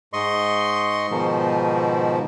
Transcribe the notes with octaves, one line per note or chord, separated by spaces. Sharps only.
G#2 D#5 C6 C#6
G#2 B2 D#3 F3